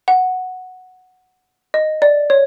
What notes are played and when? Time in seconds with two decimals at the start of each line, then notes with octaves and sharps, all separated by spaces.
0.08 F#5
1.74 D#5
2.02 D5
2.30 C#5